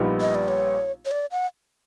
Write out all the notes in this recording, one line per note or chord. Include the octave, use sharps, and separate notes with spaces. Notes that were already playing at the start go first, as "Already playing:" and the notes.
Already playing: A#1 A#2 G3 B3 D#4
D#5
D5
C#5
C#5
D5
F#5